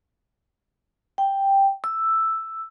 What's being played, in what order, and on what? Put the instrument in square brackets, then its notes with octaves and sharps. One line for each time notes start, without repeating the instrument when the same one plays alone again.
[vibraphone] G5
E6